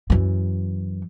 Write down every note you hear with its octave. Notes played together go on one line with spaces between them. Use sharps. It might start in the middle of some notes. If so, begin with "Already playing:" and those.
F#2 E3